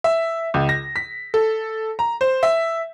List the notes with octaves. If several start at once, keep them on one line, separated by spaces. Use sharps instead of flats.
E5
C#2
A#6
B6
A4
A#5
C5
E5